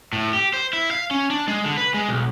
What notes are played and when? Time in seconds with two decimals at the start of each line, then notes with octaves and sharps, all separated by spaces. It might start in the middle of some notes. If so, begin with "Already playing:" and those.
0.13 A2
0.33 G4
0.54 C5
0.73 E4
0.91 F5
1.11 C#4
1.30 D4
1.48 G#3
1.64 D3
1.78 B4
1.94 G#3
2.09 B1